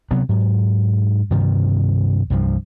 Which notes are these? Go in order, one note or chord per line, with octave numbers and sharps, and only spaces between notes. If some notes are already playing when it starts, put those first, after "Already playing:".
C3 F#3 B3
G#2 F#3
G2 C3 D#3 F3
C2 G2 F3